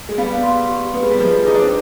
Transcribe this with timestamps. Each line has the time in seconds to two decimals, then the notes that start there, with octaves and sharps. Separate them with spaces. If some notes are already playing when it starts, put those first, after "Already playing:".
0.09 G#3
0.18 G3 B3 F5
0.43 C6
0.69 G4
0.94 B3 B4
1.03 G#3
1.11 G3
1.20 F3 G#3 B4
1.45 D#4 G#4
1.54 D4
1.62 C4